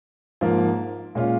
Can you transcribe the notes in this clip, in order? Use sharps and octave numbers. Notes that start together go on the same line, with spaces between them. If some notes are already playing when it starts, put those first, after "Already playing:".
G#2 F3 A#3
A#2 G#3 C#4 F4